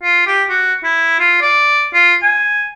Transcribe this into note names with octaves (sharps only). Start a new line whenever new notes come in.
F4
G4
F#4
E4
F4
D5
F4
G#5